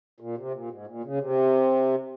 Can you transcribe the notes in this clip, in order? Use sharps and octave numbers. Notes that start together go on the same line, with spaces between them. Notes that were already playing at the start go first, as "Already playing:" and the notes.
A#2
C3
A#2
G#2
A#2
C#3
C3